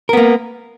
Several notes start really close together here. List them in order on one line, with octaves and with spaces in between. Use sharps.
A#4 B3 A#3